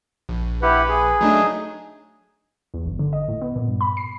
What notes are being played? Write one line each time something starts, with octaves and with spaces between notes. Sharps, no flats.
A#1
E4 G4 B4 F#5
G#4
F#3 A3 D4 D#4
E2
G1
D3
D#5
A2
B3
A#2
G2
B5
C7